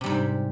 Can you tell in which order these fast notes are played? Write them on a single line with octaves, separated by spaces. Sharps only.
C3 G3 G#2